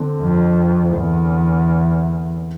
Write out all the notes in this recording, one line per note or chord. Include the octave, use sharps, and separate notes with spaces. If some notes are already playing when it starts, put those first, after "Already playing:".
Already playing: D3 C4
F2
E2